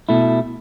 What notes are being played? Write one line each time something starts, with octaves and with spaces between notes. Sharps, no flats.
B2 A3 E4